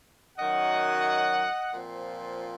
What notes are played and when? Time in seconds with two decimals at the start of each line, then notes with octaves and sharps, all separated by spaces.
0.38 F#2 D#3 F#3 D#5 F#5
1.72 A#2 F3 C4